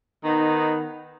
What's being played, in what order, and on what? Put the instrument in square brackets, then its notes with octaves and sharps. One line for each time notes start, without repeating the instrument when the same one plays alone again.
[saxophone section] D#3 B3 D#4